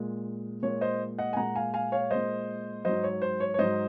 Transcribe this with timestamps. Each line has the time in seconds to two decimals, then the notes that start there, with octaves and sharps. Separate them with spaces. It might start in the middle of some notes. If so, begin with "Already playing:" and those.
Already playing: A#2 G#3
0.63 A#2 G#3 C#5
0.81 C5 D#5
1.18 D#5 F#5
1.33 G#5
1.37 A#2 G#3 F#5 A#5
1.55 F5 G#5
1.74 F5 G#5
1.92 C#5 F5
2.11 A#2 G#3 C5 D#5
2.85 G#2 F#3 C5 D#5
3.04 C#5
3.22 C5
3.40 C#5
3.54 C#5
3.58 G#2 F#3 C5 D#5